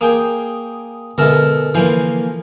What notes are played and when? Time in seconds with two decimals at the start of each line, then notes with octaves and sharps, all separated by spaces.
0.01 A#3 G#4 G5 D#6
1.18 B2 D3 G#3 A4 A#4 E5
1.74 E3 F3 A#3 F5 G#5